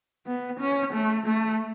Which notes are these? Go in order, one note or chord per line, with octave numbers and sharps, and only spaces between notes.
B3
C#4
A3
A3